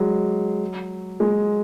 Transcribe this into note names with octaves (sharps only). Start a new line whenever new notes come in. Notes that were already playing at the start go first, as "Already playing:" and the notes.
Already playing: F#3 G#3
G#3